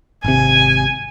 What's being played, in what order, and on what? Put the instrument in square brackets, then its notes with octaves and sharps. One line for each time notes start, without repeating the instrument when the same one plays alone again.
[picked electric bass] G#1 C3 [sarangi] G#5